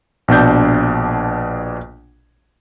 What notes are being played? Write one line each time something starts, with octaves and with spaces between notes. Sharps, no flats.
A#1 B2 D4 G6